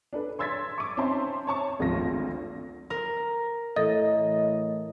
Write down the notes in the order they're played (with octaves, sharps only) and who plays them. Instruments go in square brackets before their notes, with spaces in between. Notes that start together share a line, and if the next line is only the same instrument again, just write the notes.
[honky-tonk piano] D4 A4 B4
C#5 C6 E6 G#6 A6 B6
C#6 D6
C4 C#4 D#4 E5 A5 C6
C#5 A5 C#6
G#1 D2 F3 F4 A#6
[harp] A#4
[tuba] A2 [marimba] E3 A4 [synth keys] D#5